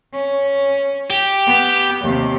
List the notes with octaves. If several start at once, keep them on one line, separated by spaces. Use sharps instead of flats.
C#4
G4
B3
D#2 C3